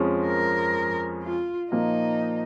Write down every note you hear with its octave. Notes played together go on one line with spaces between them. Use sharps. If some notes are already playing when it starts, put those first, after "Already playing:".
Already playing: F2 F3 G#3 C#4
A#4
F4
A#2 F3 A#3 D#4 F4